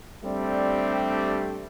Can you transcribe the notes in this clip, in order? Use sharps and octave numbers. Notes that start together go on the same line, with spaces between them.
G3 A3 C4 D4 G4